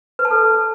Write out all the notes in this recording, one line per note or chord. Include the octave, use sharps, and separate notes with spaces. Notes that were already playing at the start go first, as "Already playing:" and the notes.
B4
A5
A4